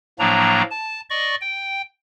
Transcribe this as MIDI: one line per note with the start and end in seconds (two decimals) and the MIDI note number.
0.19 0.62 45
0.19 0.62 53
0.19 0.62 54
0.19 0.62 58
0.19 0.62 62
0.19 0.62 82
0.71 1.00 81
1.10 1.35 74
1.10 1.35 75
1.10 1.35 85
1.41 1.82 79